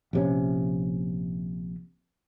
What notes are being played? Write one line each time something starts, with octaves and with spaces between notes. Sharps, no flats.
A#1 C3 C#4